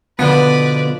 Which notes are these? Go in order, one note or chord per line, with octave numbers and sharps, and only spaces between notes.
B2 D3 F3 B3 B4 D5